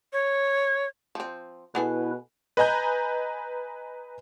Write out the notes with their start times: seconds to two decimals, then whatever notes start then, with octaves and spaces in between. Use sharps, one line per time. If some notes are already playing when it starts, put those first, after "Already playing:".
0.12 C#5
1.15 F3 C4
1.75 B2 B3 E4 G#4 A4 B4
2.57 B4 D#5 G#5 A#5 G6